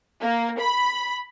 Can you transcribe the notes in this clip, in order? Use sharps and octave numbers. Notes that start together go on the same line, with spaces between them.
A#3
B5